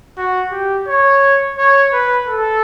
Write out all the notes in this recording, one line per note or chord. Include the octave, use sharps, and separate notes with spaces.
F#4
G4
C#5
C#5
B4
A4